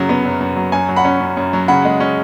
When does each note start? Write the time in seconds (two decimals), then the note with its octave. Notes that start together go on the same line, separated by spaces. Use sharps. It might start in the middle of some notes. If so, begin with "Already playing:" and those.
Already playing: F#2 C#3 F#3
0.09 B3
0.25 F#2
0.40 F#2
0.56 F#3
0.72 F#2 G#5
0.89 F#3
0.96 F#5 B5
1.05 C#4
1.20 F#2
1.37 F#2
1.53 F#3
1.68 C#3 F#5 B5
1.85 G#3
2.00 C#4